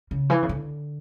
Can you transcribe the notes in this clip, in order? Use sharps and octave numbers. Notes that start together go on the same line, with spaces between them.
C#3
E3
C#3
D3